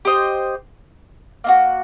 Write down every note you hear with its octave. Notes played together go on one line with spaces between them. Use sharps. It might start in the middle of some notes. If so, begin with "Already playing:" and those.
G4 C5 D#5
A#3 D#4 F#4